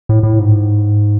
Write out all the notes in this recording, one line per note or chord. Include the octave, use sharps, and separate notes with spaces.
A2
A2
G#2